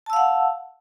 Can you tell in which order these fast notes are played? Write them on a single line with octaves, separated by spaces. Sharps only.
A5 E6 F5 F#5